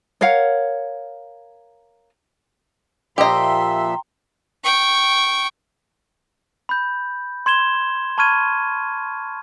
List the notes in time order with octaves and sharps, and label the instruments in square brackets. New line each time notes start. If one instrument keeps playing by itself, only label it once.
[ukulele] A#4 C#5 F5 F#5
[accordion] A#2 F3 E5 [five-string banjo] G4 D#5 [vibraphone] G5 A#5 [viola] C6
[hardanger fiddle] G5 C#6
[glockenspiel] B5 G6
C6 G#6 E7 G7
A5 B5 C#6 F6 G#6 D#7